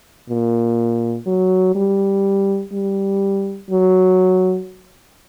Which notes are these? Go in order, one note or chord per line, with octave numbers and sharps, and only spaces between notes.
A#2
F#3
G3
G3
F#3